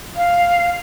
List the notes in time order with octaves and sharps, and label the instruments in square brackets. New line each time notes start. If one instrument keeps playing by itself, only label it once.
[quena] F5